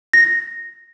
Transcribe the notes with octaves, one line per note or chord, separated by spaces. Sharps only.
A#6